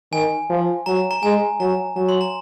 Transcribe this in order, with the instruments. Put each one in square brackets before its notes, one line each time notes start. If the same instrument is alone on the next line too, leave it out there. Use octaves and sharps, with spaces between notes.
[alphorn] D#3 [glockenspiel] G#5
[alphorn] F3
[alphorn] F#3 [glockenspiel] A#5
[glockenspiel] A#5
[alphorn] G#3 [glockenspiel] G#5
[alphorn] F#3 [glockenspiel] A#5
[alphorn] F#3 [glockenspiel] A#5
[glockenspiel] C6
A#5